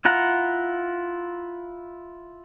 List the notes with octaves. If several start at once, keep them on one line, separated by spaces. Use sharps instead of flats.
E4 F4 F#5 A#5